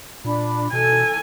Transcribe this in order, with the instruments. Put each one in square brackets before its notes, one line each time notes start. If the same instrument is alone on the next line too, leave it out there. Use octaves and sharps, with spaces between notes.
[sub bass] A#2 [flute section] D4 B5
[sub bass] B2 [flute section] A4 [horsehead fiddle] G#5